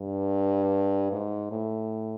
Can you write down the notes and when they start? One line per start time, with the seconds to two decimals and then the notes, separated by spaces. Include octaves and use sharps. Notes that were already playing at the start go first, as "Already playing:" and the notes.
Already playing: G2
1.12 G#2
1.51 A2